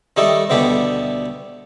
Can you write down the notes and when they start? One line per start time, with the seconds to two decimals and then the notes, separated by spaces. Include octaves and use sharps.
0.17 D#3 G3 A3 D#4 A4
0.50 D2 B2 D3 G3 G4 A4